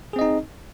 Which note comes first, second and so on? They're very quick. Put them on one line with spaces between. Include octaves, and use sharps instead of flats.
G#4 C4 D#5 D#4